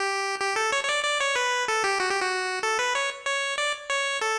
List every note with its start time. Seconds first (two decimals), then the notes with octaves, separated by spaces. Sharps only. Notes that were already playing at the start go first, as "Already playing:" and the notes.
Already playing: G4
0.40 G4
0.56 A4
0.72 C#5
0.83 C#5
0.89 D5
1.04 D5
1.20 C#5
1.36 B4
1.68 A4
1.84 G4
2.00 F#4
2.11 G4
2.21 F#4
2.63 A4
2.79 B4
2.95 C#5
3.26 C#5
3.58 D5
3.90 C#5
4.21 A4